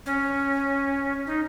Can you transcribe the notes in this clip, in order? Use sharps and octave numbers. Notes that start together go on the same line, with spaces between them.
C#4
D#4